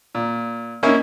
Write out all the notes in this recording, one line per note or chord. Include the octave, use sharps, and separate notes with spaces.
A#2
A#3 C#4 D#4 E4